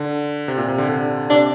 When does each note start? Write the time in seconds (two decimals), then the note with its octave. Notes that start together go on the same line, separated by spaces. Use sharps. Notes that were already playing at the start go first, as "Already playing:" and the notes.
Already playing: D3
0.48 C3
0.58 A#2
0.68 C3
0.78 D3
0.89 D3
1.30 C3 D4